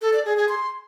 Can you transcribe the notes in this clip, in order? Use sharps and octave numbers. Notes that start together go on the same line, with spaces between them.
A4
D5
G#4
G#4
C6